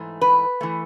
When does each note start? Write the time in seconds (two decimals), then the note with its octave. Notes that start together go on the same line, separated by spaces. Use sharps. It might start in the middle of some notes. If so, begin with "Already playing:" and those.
Already playing: G#2 E3 A3
0.21 B4
0.61 E3 A3